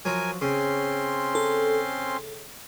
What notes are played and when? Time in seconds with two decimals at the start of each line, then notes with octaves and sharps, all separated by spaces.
0.05 F3 F#3 A#4 G#5
0.41 C#3 C4 C#4 C6
1.35 A4